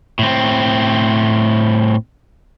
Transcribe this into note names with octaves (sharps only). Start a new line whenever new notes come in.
A2 C4